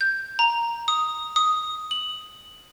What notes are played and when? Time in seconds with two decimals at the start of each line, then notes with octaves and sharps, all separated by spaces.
0.01 G6
0.39 A#5
0.88 D#6
1.36 D#6
1.91 F#7